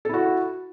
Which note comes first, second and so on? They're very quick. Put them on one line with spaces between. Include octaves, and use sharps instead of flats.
A4 E4 F#4